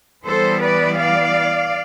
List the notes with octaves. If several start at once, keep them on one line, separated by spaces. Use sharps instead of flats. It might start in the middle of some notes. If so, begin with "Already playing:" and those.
E3 G3 B3 A4 C5
B4 D5
D5 F5